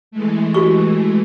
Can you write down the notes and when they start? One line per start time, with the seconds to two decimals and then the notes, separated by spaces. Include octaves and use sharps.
0.11 E3 G#3 A3
0.54 F#4 G4 C#6